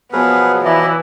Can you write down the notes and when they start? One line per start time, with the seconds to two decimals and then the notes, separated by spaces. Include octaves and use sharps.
0.13 B2 F3 F#3 B3 G#4 A#4 B4
0.65 E3 E4 D5 D#5